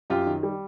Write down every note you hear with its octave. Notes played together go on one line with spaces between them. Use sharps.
F#2 F4 G4
D#3
G3